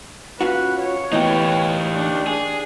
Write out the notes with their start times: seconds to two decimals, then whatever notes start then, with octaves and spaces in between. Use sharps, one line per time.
0.41 C#4 F4 F#4 B4
0.80 C#5
1.13 A2 E3 B3 D#4 G4
1.94 D4
2.27 D4 G#4